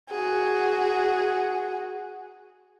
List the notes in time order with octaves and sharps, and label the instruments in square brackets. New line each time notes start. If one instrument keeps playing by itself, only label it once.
[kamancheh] F#4 G#4